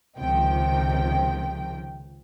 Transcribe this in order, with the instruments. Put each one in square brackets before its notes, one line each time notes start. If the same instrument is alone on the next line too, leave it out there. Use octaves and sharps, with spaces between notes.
[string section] C#2 C3 D#3 F3 G5